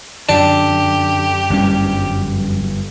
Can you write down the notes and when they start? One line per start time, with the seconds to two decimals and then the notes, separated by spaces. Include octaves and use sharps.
0.29 F#2 D3 D4 G4
1.50 G1 G3 C#4